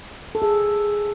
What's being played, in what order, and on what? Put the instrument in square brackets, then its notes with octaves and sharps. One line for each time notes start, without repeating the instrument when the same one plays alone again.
[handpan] A4
G#4